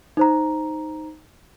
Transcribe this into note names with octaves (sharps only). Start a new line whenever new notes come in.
D#4 C5 A#5